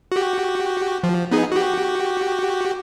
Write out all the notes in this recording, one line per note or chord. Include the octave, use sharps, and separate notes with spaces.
F#4 G4
F3
B3 D#4 G#4
F#4 G4